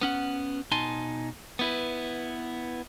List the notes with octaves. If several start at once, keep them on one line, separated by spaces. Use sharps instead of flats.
B3 C#4 F#5
B2 D#4 G#5 A5 C6
B3 E4 B4